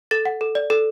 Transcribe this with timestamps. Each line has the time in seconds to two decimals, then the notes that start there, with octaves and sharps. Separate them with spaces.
0.11 A4 A6
0.25 F#5
0.41 A4
0.55 D5
0.70 A4